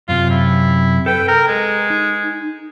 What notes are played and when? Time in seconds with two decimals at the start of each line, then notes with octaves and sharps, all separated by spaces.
0.09 F#2 C3 F4
0.31 E4
1.06 A4 B4 G5
1.28 A#4
1.48 G#3
1.90 D#4